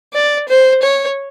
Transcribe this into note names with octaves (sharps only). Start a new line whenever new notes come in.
D5
C5
C#5